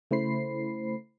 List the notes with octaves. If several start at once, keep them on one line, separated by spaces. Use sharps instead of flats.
C#3 A3 E4 C5 B5 C7